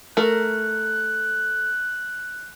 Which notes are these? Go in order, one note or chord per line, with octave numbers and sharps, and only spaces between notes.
A3 A#4 F#6